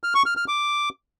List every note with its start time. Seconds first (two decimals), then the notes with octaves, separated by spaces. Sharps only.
0.04 F6
0.15 C#6
0.26 F6
0.37 F6
0.48 D6